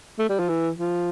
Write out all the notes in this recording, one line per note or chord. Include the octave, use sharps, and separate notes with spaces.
A3
G3
F3
E3
F3